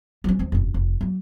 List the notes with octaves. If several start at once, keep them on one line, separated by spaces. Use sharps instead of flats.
F#3 C#4
D#2 C4
F1 F#2
F1
F#3 A#3